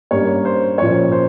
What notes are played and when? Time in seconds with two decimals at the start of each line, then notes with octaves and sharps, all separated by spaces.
0.11 G2 G3 A#3 C#4 C#5
0.45 C5
0.78 A#2 F3 A#3 C#4 C#5
1.12 C5